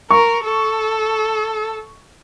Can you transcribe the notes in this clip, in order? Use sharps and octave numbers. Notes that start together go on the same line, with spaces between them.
A#4 C#6
A4